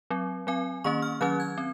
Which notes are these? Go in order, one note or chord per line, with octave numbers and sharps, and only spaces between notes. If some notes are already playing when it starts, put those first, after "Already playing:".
F#3 C4
F#3 C4 G#5
D#3 A#3 C#4 C#6
F6
D#3 F#3 C#4 F#6
G#6
C4